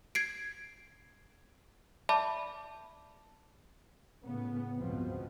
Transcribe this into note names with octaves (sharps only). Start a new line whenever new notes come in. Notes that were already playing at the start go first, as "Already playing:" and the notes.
G#6 C7 D7
D5 E5 A5 B5 D6
A2 C#3 B3
C#2 G2 B2 F3 B3 C4